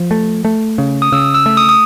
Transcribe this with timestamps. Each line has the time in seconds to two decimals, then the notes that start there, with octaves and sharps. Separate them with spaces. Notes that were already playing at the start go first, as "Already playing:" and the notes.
Already playing: F3
0.11 A3
0.45 A3
0.78 C#3
1.02 D#6
1.12 C#3 E6
1.35 E6
1.46 A3
1.57 D#6
1.69 D#6